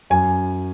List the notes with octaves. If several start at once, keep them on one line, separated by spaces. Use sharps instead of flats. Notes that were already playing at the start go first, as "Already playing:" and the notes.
F#2 G#5